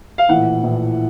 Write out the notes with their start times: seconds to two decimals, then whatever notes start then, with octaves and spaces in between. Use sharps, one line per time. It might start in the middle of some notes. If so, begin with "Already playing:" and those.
0.18 F5
0.29 A#1 A2 E3 F#5
0.63 A#1 A2 E3